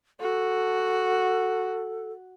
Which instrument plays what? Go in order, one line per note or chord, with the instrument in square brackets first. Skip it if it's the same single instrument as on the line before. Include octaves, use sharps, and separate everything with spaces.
[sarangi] F#4 [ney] A4